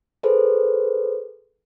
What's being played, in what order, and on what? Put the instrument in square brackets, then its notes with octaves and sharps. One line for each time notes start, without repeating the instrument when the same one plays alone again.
[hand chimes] G#4 A4 B4 C5